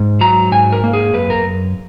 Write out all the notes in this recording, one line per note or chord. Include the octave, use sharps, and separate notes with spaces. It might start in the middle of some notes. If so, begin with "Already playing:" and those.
Already playing: G#2
F#3 A#5
G#2 G#5
A#4
A#3
G#4
F#2 B4
A#4